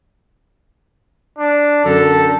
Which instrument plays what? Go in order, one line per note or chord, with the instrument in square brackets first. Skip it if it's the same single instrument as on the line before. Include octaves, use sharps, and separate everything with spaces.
[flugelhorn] D4
[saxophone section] F#2 D3 [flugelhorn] A4